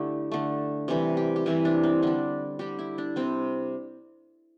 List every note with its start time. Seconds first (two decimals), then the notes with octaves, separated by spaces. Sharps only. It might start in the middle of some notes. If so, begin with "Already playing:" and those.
Already playing: D3 A3 E4 G4
0.32 D3 A3
0.88 C3 E3 G3
1.17 G4
1.36 G4
1.46 C3 E3 G3 E4
1.65 D4
1.84 C4
2.02 D3 G3 D4
2.59 D3 G3 G4
2.79 E4
2.98 D4
3.16 C3 G3 C4